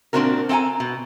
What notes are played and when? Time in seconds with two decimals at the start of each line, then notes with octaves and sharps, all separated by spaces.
0.13 A#2 G3 C4 D4 F#4 A#4
0.49 C4 A4 F#5 G#5 A#5
0.80 B2